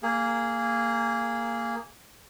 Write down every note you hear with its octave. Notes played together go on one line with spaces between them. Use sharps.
A#3 G#4